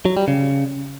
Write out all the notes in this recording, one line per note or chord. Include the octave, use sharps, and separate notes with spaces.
F#3
G3
C#3